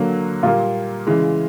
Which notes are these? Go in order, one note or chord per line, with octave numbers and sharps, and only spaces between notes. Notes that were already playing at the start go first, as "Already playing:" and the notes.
Already playing: D3 F#3 A#3
A#2 G3 A#3 F4
C#3 E3 G#3